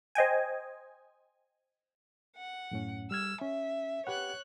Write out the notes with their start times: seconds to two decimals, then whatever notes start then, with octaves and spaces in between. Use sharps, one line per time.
0.15 C5 D#5 G5 G#5
2.36 F#5
2.71 F#2 A2 C#4
3.11 G3 E6 F6 G#6
3.42 C#4 E5
4.07 G4 B4 C#5 F#5 F#6